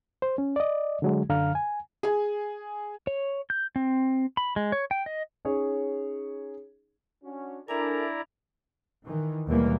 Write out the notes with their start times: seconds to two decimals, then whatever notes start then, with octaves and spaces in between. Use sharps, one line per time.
0.22 C5
0.38 C#4
0.56 D5 D#5
1.02 D3 F#3 G#3
1.29 F#2 D3 F5 A#5 F6
1.55 G#5
2.03 G#4 G#5
3.07 C#5
3.50 G6
3.76 C4
4.37 B5
4.56 G#3
4.72 C#5
4.91 G5
5.06 D#5
5.45 C#4 D#4 G#4 C#5
7.24 C#4 D4 F#4
7.68 D4 E4 A4 A#4 D5 E5 G#5 A#5
9.05 D#3 E3
9.46 D#2 B2 E3 G3 G#3 A#3